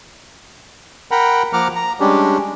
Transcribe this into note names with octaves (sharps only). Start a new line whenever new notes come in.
A#4 F#5 G5 A#5 B5
F3 A#3 F#5 A#5 D6 F6
A#5
G3 G#3 C#4 D4 G4